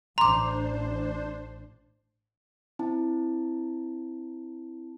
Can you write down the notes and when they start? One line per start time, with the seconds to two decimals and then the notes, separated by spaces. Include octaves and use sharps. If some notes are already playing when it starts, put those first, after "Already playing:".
0.18 A1 D4 C5 A#5 C6 D6
2.79 C4 E4 A5